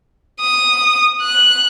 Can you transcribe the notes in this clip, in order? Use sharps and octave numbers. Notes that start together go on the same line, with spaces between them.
D#6
F#6